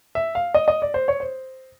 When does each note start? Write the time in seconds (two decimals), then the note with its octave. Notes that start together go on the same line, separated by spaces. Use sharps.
0.15 E5
0.35 F5
0.54 D#5
0.68 D#5
0.82 D5
0.94 C5
1.08 C#5
1.20 C5